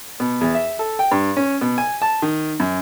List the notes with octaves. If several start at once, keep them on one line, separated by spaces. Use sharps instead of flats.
B2
E2
E5
A4
G5
G2
C#4
B2
G#5
A5
D#3
F#2